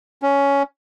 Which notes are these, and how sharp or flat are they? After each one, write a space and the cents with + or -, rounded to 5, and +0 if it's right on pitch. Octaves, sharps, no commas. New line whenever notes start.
C#4 +10